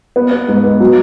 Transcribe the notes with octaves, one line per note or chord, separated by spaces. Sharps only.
B3
B3
G#2
B3
F#3